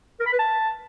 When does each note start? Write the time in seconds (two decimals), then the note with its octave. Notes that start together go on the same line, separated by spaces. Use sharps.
0.20 A#4
0.26 B5
0.32 B4
0.39 A5